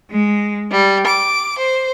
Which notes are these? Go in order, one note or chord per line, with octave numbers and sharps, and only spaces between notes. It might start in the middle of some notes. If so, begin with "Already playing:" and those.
G#3
G3
D6
C5